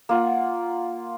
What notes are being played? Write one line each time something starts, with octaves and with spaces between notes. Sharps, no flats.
A#3 F4 F#5